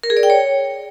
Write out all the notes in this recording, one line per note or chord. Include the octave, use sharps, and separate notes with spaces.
A#4
G#4
D5
G5
C#5